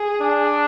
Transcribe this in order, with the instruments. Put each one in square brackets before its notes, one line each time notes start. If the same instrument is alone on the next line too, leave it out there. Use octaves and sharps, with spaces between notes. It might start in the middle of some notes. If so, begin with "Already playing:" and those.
Already playing: [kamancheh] G#4
[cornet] D4